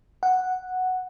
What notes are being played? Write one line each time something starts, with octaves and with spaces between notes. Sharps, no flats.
F#5